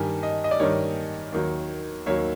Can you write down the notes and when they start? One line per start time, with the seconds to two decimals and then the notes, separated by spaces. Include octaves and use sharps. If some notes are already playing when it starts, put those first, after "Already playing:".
Already playing: G2 D#3 G3 G#5
0.23 D#5
0.44 D#5
0.51 D5
0.59 G2 D#3 G3 C#5
1.32 D#2 D#3 F#3
2.06 D#2 D#3 F#3 C#5